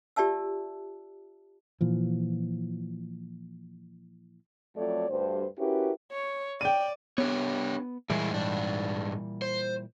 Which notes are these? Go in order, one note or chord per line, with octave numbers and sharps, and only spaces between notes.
F4 G4 D5 E5 A5 E6
A#2 E3 F3
F2 F#3 A3 C#5 D5
D2 G2 C5
C#4 E4 F#4 G4 A#4 B4
C#5
D5 G5 D#7
B3 D4 G4 C#5
A#2 E3 G3 G#3 E4
G#2 D4
C5